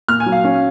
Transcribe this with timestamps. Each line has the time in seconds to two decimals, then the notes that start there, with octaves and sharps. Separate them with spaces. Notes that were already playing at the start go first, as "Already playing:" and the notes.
0.08 A#2 F6
0.20 G#5
0.26 F#3
0.32 F5
0.44 C#4